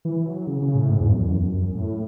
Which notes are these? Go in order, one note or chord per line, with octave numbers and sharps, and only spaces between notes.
E3
F#3
C#3
C#3
A2
G#2
E2
F#2
E2
F#2
F#2
F#2
A2